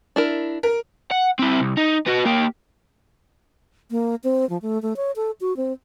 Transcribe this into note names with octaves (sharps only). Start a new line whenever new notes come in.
D4 E4 A#4
A#4
F#5
C4 E4
C2
D#4
B3 F#4
A#3 G4
A#3
C4
F3
A3
A3
C#5
A4
F#4
C4